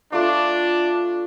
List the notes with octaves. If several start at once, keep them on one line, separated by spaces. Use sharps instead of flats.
A3 D4 F4 D6